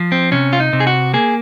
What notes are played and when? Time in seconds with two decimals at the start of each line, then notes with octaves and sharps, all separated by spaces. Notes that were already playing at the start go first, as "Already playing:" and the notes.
Already playing: F3
0.12 C4
0.32 C3 C#4
0.53 F4
0.60 D#4
0.73 C3
0.80 G#4
0.87 F#4
1.14 A#3 G#4